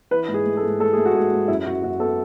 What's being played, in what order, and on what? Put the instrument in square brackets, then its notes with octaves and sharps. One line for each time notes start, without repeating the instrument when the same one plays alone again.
[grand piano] E3 B4
G#2
G#4
A3
A4
G#2
A3 A4
A3 G#4
F#4
G#2 G#4
G#2
F#2 E4
F#2 F#4
F#2 F#4
B3 A4